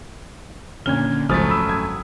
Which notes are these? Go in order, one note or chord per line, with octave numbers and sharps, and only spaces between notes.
A#2 D3 C#4 F6 G#6 G7
D3
G#1 C#2 F#2 F3 A3 D#6 F6 A6
B5 E6
G#6